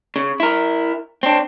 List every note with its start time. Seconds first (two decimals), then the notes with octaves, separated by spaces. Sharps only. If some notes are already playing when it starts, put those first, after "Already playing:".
0.16 C#3
0.40 E4 A#4
1.23 C4 D4